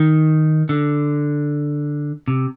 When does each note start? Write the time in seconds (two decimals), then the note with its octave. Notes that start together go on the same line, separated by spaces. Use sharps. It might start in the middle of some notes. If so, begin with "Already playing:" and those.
Already playing: D#3
0.69 D3
2.28 C3